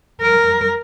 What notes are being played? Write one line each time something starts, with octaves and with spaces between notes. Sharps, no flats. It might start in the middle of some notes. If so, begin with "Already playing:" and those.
A#4